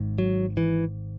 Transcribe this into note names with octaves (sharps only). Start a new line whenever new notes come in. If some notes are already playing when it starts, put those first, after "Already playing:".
Already playing: G#1 G#2
F#3
E3